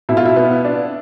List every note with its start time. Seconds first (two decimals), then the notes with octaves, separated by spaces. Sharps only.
0.09 B2 E4
0.17 F4
0.25 E4
0.36 B3
0.65 D4